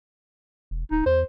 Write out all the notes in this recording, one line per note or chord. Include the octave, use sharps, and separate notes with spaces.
E1
D1 D#4
E2 C5